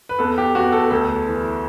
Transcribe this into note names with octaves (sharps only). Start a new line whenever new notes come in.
B4
E2 A4
G4
E2 F#4
A4
D2 A4
E3